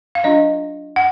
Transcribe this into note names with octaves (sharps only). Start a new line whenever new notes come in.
F5
F#3 D4 F4 D#5
F#5